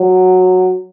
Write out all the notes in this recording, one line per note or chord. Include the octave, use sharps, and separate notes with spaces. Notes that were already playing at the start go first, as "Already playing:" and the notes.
Already playing: F#3